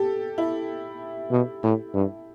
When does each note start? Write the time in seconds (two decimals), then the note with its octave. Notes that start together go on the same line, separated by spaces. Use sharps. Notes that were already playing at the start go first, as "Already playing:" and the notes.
Already playing: G4 A4
0.38 E4
1.31 B2
1.63 A2
1.94 G2